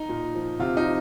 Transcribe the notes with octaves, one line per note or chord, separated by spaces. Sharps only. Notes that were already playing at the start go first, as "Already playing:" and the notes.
Already playing: D#4
A#2
F3
C3 F4
D#4
F3